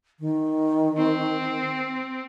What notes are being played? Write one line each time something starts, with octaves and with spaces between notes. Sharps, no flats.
D#3
C4